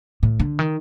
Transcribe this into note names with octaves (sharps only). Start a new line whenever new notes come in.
A2
D3
D#3